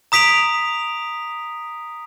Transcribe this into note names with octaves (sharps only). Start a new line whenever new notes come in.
A#5 D#6 B6 D7 F7